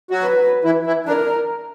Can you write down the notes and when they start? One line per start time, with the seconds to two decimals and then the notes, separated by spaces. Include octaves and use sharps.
0.10 F#3 F#4
0.21 B4
0.64 E3 E4
0.85 E3 E4
1.06 D3 D4 A#4